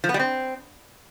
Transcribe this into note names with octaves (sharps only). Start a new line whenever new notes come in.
F3
B3
G3
C4